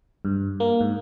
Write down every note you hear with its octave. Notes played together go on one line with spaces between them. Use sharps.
G2
A#3
G#2